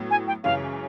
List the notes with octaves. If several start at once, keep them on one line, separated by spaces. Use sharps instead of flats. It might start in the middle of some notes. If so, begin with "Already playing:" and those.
Already playing: A2 F#3 B3
G#5
G5
F#2 C#3 E3 G#3 C#4 F5